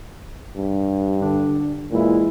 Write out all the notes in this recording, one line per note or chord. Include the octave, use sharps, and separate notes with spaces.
G2
D3 D4
A#2 E3 G#3 E4